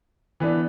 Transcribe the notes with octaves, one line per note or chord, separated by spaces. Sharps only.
E3 B3 D4